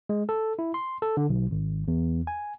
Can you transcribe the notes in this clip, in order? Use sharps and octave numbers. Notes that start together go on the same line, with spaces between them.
G#3
A4
E4
C6
A4
D3
B1
G#1
E2
G#5